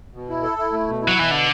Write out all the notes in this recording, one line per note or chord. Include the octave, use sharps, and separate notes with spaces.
B2
E4
A4
E4
A3
B2
E4
F#3
B2 E3
D3